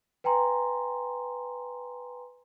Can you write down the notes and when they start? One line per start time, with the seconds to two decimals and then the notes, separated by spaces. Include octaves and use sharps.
0.24 B4 G5 G#5 A#5 C6